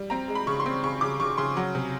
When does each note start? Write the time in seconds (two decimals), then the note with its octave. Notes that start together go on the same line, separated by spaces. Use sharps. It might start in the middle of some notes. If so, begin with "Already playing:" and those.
Already playing: G3
0.10 C4 A#5
0.28 G#3
0.35 B5
0.47 C#3 C#6
0.60 C6
0.66 C4
0.84 C#3 C#6
1.01 C#3 D6
1.20 C#3 C#6
1.38 C#3 C6
1.57 F#3
1.75 C3